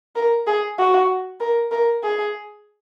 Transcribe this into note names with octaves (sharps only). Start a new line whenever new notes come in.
A#4
G#4
F#4
A#4
A#4
G#4